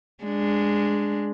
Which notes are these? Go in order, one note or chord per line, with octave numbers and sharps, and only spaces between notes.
G#3 D4